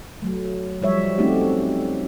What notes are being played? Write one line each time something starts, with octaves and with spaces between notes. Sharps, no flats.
F#3 A3
F3 G3 C#5 E5
A3 C4 C#4 D#4 F#4 G4